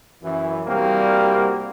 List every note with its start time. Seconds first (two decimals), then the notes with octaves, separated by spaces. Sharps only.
0.23 F#2 E3
0.67 C2 G3 A#3 C4 F#4